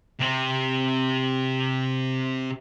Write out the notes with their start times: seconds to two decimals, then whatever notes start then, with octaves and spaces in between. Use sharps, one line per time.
0.20 C3 C4